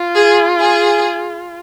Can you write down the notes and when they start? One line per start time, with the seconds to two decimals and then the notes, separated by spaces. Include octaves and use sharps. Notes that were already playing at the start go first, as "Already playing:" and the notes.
Already playing: F4
0.14 G#4
0.62 G#4